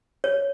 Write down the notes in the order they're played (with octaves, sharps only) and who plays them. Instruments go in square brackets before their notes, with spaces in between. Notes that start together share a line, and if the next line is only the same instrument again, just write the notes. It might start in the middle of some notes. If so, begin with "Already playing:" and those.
[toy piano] C#5